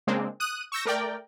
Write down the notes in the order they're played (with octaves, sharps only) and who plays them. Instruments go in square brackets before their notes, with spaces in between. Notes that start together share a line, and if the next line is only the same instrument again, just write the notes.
[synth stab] C#3 G#3 A#3 C4 D4
D#6 F#6 D#7
C#6 E6 G6 A#6
A3 A#4 D5 G5